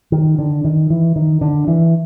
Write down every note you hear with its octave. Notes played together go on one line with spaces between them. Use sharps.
D#3
D3
D#3
E3
D#3
D3
E3